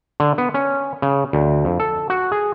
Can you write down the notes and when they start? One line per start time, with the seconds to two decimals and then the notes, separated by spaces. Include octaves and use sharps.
0.20 D3
0.38 B3
0.54 C#4
1.02 C#3
1.33 D2
1.65 F2
1.80 A4
2.10 F#4
2.32 G#4